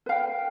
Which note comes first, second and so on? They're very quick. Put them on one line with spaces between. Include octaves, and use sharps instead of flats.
B4 F5 G5